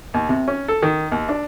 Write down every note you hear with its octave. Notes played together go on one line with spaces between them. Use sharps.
D#2
C3
C#4
A4
D#3
D#2
D4